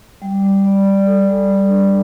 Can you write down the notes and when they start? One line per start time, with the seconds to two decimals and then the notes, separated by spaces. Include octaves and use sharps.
0.22 G3
0.43 G3
0.65 D5
0.85 D5
1.06 A4
1.28 G3
1.49 G3
1.69 D4